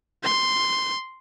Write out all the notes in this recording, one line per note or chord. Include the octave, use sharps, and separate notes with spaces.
C6